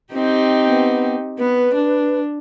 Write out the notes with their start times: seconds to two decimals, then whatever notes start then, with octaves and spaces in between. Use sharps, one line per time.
0.14 C4 D#4 G4
0.67 B3
1.39 B3 B4
1.74 D4